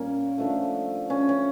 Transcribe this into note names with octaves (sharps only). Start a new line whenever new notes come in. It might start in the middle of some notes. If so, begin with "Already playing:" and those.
Already playing: A#2 G3 A#3 C#4
D3 F3 A3
C#4
C#4